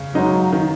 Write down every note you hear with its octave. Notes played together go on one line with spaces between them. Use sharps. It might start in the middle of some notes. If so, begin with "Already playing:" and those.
Already playing: C#3
F#3 G#3 D#4
D#3